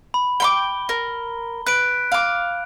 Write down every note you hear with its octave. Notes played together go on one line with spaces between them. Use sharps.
B5
G5 B5 D6 G7
A#4
B4 F#6 D7
F5 D6